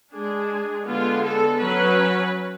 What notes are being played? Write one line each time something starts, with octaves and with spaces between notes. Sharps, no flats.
G#3 D4 G#4
D3 G#3 B3 F4
A4
F#3 C#4 B4